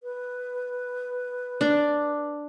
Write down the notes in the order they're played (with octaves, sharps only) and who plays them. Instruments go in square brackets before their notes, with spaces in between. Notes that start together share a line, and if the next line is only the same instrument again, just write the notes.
[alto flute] B4
[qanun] D4